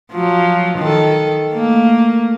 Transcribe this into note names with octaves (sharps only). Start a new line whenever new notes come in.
F3 F#3
D#3 A4
A3 A#3